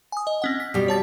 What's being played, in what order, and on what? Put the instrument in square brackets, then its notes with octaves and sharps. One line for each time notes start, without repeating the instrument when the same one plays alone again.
[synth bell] G#5 D#6
D#5
C4 C#4 F#5
B6
[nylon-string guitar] B2 G3 [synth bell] B6
[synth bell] C#5 A5 A6